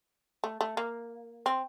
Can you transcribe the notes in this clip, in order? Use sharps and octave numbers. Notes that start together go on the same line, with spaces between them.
A3
A3
A#3
C4